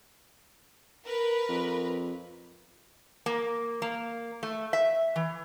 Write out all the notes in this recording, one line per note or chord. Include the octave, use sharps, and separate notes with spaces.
A#4 B4
F2
A#3
A#3
A3
E5
E3